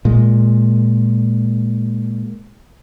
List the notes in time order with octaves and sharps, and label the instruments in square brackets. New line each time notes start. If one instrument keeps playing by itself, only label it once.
[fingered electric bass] A#2 G#3